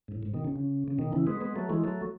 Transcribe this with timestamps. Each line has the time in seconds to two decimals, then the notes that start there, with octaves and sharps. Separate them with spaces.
0.08 G#2
0.12 A2
0.23 G#2
0.34 B2 D#3
0.44 C#3
0.56 C#3
0.88 C#3
0.98 B2 D#3
1.12 C#3 E3
1.27 G#3 B3
1.41 G#3 B3
1.56 F#3 A3
1.70 E3 G#3
1.84 F#3 A3